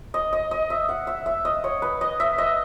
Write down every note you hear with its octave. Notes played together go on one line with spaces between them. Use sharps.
D#5
D#5
D#5
E5
F#5
E5
E5
D#5
C#5
B4
D#5
E5
D#5